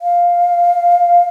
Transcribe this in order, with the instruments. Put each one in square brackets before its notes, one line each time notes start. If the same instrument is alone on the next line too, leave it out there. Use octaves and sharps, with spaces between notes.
[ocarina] F5